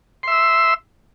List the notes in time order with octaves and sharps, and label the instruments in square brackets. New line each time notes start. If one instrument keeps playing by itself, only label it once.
[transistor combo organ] C6
E5
E6